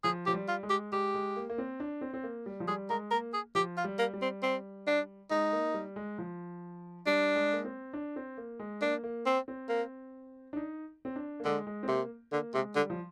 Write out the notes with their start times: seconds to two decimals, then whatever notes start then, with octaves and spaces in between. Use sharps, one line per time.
0.04 F3 G#4
0.26 F3 G4
0.33 G3
0.49 F4
0.63 G#3
0.70 G4
0.92 G#3 G4
1.14 G#3
1.36 A#3
1.50 A#3
1.58 C4
1.80 D4
2.01 C4
2.14 C4
2.24 A#3
2.46 G3
2.60 F3
2.68 G3 G#4
2.90 G#3 A#4
3.11 A#3 A#4
3.34 G#4
3.55 F3 G4
3.77 F4
3.84 G3
3.99 A#3
4.14 G3
4.22 C4
4.43 C4
4.87 D4
5.31 G#3 D#4
5.53 A#3
5.74 G3
5.96 G#3
6.18 F3
7.06 G3 D4
7.36 G#3
7.53 A#3
7.65 C4
7.93 D4
8.16 C4
8.38 A#3
8.59 G#3
8.81 A#3 D4
9.04 A#3
9.26 C4
9.48 C4
9.69 A#3
10.53 D4
10.56 D#4
11.05 C4
11.16 D4
11.40 A#3
11.45 D3 G#3
11.67 G#3
11.83 C4
11.88 C3 A#3
12.32 D3 A#3
12.54 C3 G#3
12.76 D3 G3
12.90 F3